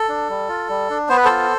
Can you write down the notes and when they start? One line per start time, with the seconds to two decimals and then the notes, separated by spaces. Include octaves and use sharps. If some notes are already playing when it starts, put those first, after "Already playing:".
Already playing: A4
0.09 D4
0.29 G3
0.49 F4
0.69 G3
0.90 D4
1.09 B3 C5
1.17 B4
1.25 F4 A4 C5